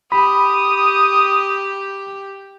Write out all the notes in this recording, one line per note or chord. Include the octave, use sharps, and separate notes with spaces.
G4 B5 D#6